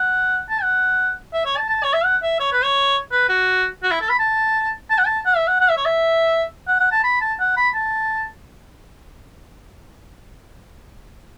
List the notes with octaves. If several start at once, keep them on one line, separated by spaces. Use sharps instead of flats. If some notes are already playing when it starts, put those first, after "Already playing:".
Already playing: F#5
A5
F#5
E5
C#5
A5
A5
C#5
E5
F#5
E5
C#5
B4
C#5
B4
F#4
F#4
E4
A4
B5
A5
A5
F#5
A5
F#5
E5
F#5
F#5
E5
C#5
E5
F#5
F#5
A5
B5
A5
F#5
B5
A5